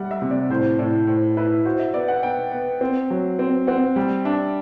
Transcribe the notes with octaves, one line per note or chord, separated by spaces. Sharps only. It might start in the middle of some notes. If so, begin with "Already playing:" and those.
Already playing: G3 E5 F#5
E5
C3
D5
A2 C5
A2 D5
A2 C5
E4 B4
F#4 C5
E5
B3 D5
F#5
B3 G5
B3
C4
F#3
C4
C4 F#5
G3 G5
D4 E5